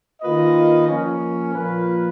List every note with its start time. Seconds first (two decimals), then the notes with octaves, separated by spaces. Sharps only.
0.21 D#3 A#3 F4 B4 D#5
0.87 F3 A#3 C#4
1.53 A#2 F3 A#3 F4 B4